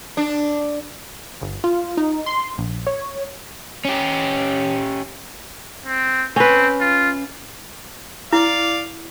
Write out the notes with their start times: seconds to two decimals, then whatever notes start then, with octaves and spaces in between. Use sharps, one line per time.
0.17 D4
1.41 G1
1.64 F4
1.97 D#4
2.26 C6
2.58 A#1
2.87 C#5
3.85 C#4 G4
5.86 C4
6.36 C4 C#4 B4
6.81 F4
8.33 E4 D5 F5